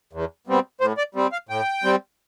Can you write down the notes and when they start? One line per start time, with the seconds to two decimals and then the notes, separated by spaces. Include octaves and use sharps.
0.13 E2
0.47 B2 G3 C4
0.81 A2 C5
0.98 D5
1.15 G3 C4
1.32 F5
1.49 A2 G5
1.84 G3 C4